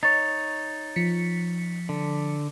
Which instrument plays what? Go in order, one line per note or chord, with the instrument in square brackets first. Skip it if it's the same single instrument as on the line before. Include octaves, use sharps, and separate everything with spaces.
[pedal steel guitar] D#4 C#5 [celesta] A6
[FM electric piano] F3 B6 C#7
[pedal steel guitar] D3